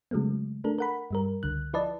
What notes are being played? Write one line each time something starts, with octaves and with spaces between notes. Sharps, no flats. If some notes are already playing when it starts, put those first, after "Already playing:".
C#3 F#3 G#3 A3 B3
A3 D4 A4 A#4
A#4 F#5 B5
G2 G3 A#4
C#2 D3 F#6
F3 E4 B4 D5 D#5 A5